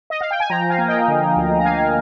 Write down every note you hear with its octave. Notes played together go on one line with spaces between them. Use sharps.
D#5
F5
G5
G#5
F3 G5 A#5
F5 G#5
A#3
D#5 G5
D3
D2
A#5
A#3 F5 G#5